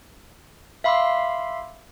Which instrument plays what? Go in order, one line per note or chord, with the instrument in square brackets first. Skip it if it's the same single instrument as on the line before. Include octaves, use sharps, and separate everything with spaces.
[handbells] E5 F5 B5 C6 D6 E6